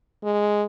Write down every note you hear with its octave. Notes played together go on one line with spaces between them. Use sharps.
G#3